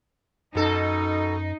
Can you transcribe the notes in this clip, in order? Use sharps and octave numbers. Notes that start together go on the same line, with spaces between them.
F#2 B2 D#4 A4